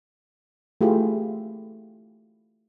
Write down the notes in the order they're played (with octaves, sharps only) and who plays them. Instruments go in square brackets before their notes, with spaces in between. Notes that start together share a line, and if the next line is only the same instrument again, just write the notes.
[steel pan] A3 E4 F4 G4 G#4